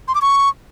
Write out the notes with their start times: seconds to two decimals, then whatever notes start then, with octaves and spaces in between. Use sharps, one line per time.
0.08 C6
0.15 D6
0.22 C#6